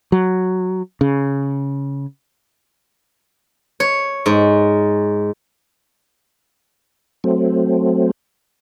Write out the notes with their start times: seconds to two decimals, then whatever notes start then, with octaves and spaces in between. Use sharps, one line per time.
0.12 F#3
1.01 C#3
3.80 C#5
4.26 G#2
7.24 F#3 A3 C4